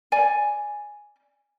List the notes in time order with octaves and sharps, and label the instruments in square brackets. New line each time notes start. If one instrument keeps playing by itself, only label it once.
[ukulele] D5 G#5